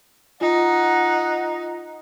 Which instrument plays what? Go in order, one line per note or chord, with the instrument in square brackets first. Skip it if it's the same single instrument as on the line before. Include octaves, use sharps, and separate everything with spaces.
[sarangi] D#4 [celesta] F4 [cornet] F#5